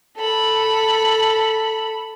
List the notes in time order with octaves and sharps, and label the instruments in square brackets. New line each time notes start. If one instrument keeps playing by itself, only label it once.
[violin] A4 B5